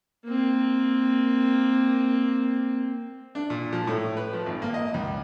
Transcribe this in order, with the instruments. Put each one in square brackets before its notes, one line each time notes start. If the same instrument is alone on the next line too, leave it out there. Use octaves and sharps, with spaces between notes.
[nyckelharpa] A#3 C4
[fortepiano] D4
A#2
F3
A2
B4
F3
G#1
A#3
D#5
C#2